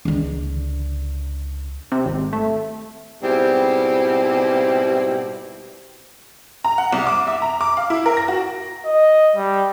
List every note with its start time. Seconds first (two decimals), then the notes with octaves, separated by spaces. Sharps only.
0.05 C#2 D3
1.92 C3
2.06 G#1
2.33 A3
3.22 G#2 B2 G3 C4 E4 G4
6.64 A#5
6.78 F#5
6.92 C2
7.07 D6
7.27 E5
7.42 A#5
7.61 D6
7.77 F5
7.90 E4
8.06 A#4
8.17 A#6
8.28 F#4
8.86 D#5
9.36 G3